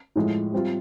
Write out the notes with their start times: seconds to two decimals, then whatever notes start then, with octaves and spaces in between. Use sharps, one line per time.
0.16 A2 F3 G#3
0.52 G3 C4 F4